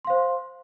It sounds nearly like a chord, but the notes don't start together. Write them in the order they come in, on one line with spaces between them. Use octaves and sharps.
C6 F5 C5